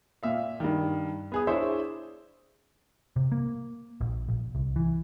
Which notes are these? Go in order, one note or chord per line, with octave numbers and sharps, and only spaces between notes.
A#2 E5 F5
G2 D#3
B3 G#4 D#6
D4 E4 G#4 C5 C#5 E5
C3
A#3
A#1
A#1
C2
E3